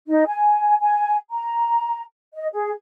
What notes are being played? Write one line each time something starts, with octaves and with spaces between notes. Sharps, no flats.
D#4
G#5
G#5
A#5
D#5
G#4